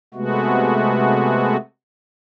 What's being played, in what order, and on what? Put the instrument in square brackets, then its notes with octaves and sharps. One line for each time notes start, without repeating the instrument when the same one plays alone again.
[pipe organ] C3 G#3 A3 B3 F#4